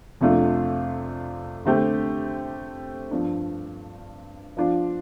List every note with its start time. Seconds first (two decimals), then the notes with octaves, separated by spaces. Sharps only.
0.21 F2 C3 A3 D4 F4
1.65 D3 A3 C4 G4
3.11 G2 F3 D4
4.57 F3 D4 F4